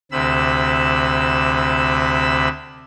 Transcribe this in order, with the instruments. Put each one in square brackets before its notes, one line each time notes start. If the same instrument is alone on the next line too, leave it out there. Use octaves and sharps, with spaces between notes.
[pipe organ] D2 C3 B5 E6